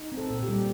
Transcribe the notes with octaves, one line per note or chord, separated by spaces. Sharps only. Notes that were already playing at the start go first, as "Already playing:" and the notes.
Already playing: D#4
C4
A4
A#2
G4
G3